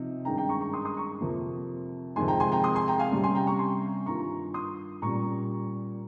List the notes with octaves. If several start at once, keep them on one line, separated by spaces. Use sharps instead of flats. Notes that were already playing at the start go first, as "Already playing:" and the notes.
Already playing: C3 F3 D#4
G2 D#3 G#3 C#4 G5 A#5
G5 A#5
A#5 C#6
A#5 C#6
C6 D#6
C6 D#6
A#5 C#6
F2 C3 F3 A#3
F2 C3 D#3 G#3 G#5 C6
G5 A#5
G#5 C6
G5 A#5
C6 D#6
G#5 C6
G5 A#5
F5 G#5
C3 G3 C#4
G#5 C6
G5 A#5
A#5 C#6
G#5 C6
G2 D#3 A#3 F4 A#5 C#6
C6 D#6
A#2 G3 C#4 A#5 C#6